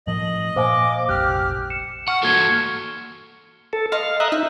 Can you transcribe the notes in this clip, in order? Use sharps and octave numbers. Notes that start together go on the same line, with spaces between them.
A2 F3 D#5 F#7
A#2 C5 F5 G#5 D6
F1 A#1 G4 F6 F#6
C#7 E7
F#5 C#6 F6 C#7
A#3 F#4 A4 G#6 G7
A4
D#5 F5 C6
A#4 D#5 E5 F#6
D#4 E5